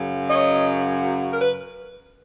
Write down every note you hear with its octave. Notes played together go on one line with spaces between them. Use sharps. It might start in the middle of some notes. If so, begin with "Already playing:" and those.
Already playing: F#2 C#3 F#3
C#5 D#5
A#4
B4